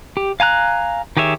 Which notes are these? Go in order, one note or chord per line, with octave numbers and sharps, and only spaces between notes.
G4
F5 G#5 A#5 F#6
D#3 G4 G#4 C#5 E5